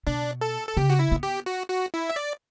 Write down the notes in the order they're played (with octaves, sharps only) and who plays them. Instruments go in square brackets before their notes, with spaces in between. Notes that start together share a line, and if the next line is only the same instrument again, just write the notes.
[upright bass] B2 [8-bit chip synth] D4
[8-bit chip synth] A4
A4
[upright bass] C#3 [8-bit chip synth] G4
[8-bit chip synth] F#4
E4
[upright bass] B3
[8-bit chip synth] G4
F#4
F#4
E4
E5
D5